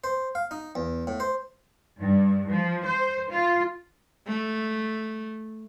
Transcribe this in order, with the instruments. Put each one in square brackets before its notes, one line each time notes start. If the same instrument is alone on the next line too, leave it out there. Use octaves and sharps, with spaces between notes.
[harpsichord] C5
F5
D#4
E2
A2
C5
[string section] G2
F3
C5
F4
[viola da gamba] A3